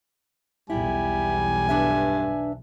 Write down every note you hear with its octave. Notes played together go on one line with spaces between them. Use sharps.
B1 E2 G3 E4 G#5
G2 D4 B4 E5